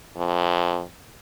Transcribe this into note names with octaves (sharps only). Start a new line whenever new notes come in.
F2